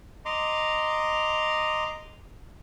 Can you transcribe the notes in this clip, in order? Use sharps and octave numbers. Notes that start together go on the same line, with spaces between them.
D#5 A#5 C6 D6